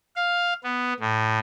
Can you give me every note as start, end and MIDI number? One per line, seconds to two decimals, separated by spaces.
0.16 0.53 77
0.64 0.93 59
1.00 1.39 45